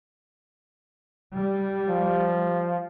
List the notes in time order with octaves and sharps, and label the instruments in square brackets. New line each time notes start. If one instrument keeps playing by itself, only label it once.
[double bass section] G3
[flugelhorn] F3